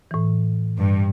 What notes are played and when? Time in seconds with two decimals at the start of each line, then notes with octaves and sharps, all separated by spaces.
0.11 A2 E3
0.79 G2